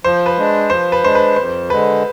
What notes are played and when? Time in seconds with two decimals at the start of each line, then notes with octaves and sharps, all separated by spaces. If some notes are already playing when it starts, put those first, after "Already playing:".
0.04 F3 C5
0.26 B4
0.37 G#3 D4
0.70 F3 C5
0.92 B4
1.04 G#3 D4 C5
1.15 B4
1.36 F2 C5
1.70 D3 G#3 B4